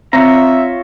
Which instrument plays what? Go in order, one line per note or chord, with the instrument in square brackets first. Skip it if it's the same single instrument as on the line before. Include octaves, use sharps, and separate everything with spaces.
[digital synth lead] C4 [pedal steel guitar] F4 C#5 A#5 [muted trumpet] E5